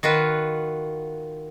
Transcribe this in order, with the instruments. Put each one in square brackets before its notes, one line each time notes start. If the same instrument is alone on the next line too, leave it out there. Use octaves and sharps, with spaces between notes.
[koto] D#3 F4 F#4 B4